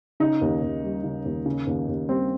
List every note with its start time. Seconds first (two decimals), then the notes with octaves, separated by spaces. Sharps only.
0.20 C#3 D#4
0.41 D#2
0.62 D#2
0.83 G3
1.04 C#3
1.25 D#2
1.46 C#3
1.67 D#2
1.88 D#2
2.09 G3 C4